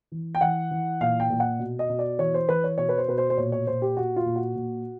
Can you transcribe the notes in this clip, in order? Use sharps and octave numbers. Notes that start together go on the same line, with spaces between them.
E3
G5
E3 F#5
E3
A#2 F5
G5
A#2
F#5
B2
D#5
B2
D5
E3 C#5
C5
E3 B4
C#5
B2 C#5
B4
C5
B2 B4
C5
C5
A#2 C#5
C#5
A#2 C5
G4
A#2 F#4
F4
A#2
F#4
A#2